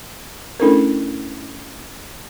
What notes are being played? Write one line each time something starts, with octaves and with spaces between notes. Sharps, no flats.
A3 C#4 D4 E4 A4 A#4